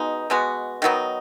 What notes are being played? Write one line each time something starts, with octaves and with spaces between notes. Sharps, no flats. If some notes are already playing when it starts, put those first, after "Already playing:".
Already playing: B2 G#3 B3 D#4
B2 G#3 B3 F#4
D#3 F#3 B3 D#4